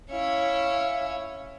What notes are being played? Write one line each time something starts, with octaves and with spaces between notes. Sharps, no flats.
C#4 E4 C#5 F5